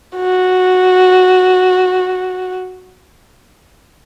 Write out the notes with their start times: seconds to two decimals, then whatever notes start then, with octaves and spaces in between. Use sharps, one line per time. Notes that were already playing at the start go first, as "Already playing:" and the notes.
0.17 F#4